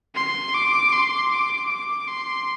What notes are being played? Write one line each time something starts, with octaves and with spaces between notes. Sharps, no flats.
C6
D6
C6
D6
D6
C6